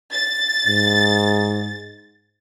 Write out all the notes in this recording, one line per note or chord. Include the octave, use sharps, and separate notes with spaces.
A6
G#2